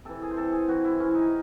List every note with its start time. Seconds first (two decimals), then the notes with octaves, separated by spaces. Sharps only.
0.05 C3 E3 A4
0.22 G#4
0.31 C5
0.36 C3 E3 A4
0.52 G#4
0.68 C3 E3 F#4
0.84 E4
0.99 C3 E3 C#4
1.15 D#4